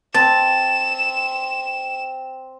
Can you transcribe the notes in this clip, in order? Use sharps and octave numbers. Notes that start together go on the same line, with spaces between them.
C4 A5 E7